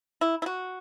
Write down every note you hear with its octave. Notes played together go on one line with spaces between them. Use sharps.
E4
E4
F#4